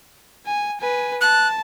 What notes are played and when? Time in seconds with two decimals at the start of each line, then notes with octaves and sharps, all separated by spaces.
0.46 G#5
0.80 B4 G#5
1.21 A5 F#6